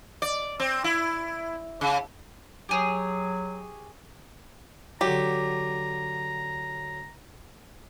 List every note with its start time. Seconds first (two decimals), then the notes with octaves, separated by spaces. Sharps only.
0.22 D5
0.60 C4
0.84 E4
1.81 C#3
2.69 F#3 G4 G#4 C#5
5.01 D3 F#3 G4 A#5